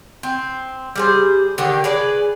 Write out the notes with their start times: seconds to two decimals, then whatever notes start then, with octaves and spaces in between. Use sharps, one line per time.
0.23 C4
0.96 G3 G#4 C5
1.58 D3 D#3 G4
1.84 G#4 B4 D5